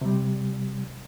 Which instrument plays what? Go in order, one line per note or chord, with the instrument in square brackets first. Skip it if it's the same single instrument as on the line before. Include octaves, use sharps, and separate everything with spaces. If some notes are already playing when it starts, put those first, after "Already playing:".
[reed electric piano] C3 G3